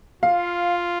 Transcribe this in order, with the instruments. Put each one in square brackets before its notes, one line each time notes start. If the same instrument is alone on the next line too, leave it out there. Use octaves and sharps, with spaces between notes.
[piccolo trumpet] F4 [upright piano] F5